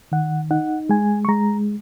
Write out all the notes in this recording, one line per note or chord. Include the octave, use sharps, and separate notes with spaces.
D#3 F#5
D#4 F#5
G#3 G#5
C#6
G#3 A#5